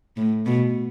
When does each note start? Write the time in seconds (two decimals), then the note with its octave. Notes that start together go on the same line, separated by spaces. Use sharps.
0.17 A2
0.46 B2